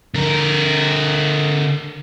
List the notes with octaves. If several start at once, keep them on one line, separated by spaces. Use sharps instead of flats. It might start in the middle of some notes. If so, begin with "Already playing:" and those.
D3 A#4